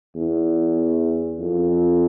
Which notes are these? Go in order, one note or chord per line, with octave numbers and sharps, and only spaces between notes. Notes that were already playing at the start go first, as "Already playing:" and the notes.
E2
F2